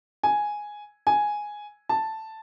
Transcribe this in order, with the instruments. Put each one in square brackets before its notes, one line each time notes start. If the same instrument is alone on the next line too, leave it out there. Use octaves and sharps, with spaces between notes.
[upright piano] G#5
G#5
A5